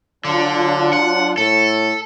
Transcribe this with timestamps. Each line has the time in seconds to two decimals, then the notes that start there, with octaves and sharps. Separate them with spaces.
0.25 D3 F#3 D4 F4
0.93 F#5
1.38 A2 A4